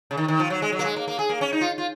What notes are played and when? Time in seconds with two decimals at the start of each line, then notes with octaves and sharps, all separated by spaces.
0.11 C#3
0.17 D#3
0.28 D#3
0.40 F3
0.50 F#3
0.62 G#3
0.72 F#3
0.79 A#3
0.84 G#3
0.96 A#3
1.08 A#3
1.19 G#4
1.29 A#3
1.41 C#4
1.53 D#4
1.61 F4
1.78 F4